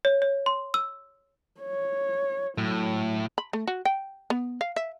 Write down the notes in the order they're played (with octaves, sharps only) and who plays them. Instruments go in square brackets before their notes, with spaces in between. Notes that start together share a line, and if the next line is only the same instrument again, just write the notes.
[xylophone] C#5
C#5
C6
E6
[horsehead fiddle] C#5
[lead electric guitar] A2 [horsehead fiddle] F#3
[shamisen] B5
A3
F#4
G5
B3
F5
E5